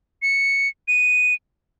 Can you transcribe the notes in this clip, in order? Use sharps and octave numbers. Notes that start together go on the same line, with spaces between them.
C#7
D#7